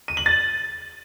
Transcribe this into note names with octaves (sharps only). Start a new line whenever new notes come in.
D#7
F#7
A6